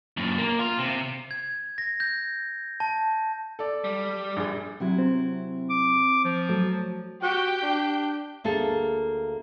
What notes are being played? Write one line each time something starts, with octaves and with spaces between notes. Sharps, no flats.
F#2 A#2
A#3
F4
C3
G#6
A#6
G6
A5
A4 D5
G3
A#1 G#4
C3 F#3 E4
C4
D6
F3
F#3 A3
F#4 G4 G5 G6
D4
D2 A#3 G#4 A4